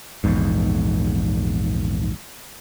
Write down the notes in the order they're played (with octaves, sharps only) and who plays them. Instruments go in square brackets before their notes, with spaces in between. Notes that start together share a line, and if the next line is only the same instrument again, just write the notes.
[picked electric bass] A#1 E2 G#2